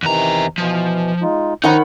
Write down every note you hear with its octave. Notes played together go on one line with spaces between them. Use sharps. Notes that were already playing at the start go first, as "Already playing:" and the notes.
E2 C3 D#3 E3 A#5
B2 E3 F3
G#3 D#4 F4
D#3 F3 D#4 F#5 B5